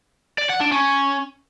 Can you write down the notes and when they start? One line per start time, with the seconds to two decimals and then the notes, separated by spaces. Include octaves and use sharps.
0.38 D5
0.50 F#5
0.61 D4
0.72 C#4